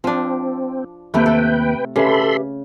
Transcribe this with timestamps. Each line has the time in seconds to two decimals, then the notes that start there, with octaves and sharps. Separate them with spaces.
0.04 F3 C4 D4
1.14 D#2 C3 A3 A#3 B4 G5
1.26 A4
1.96 C#3 G4 A4 B4 E5 B5 C6